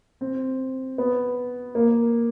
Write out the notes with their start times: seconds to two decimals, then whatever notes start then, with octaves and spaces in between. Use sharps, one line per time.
0.21 C4
0.98 B3
1.75 A#3